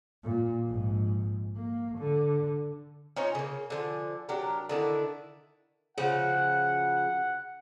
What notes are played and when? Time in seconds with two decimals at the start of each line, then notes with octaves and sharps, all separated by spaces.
0.24 A#2
0.67 A#1 G#2
1.56 A#3
1.98 D3
3.16 C#4 D#4 F4 C#5
3.35 C#3 A#3
3.70 D3 F3 G#5
4.29 F#3 D4 G4 A#4
4.69 D3 D#3 D4 E4
5.98 C#3 F3 F#4 F#5